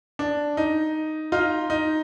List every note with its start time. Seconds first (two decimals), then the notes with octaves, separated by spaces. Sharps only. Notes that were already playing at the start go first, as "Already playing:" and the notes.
0.19 D4
0.57 D#4
1.32 D#4 F4
1.70 D#4